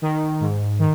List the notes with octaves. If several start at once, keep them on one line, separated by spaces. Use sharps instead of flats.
D#3
G#2
D#3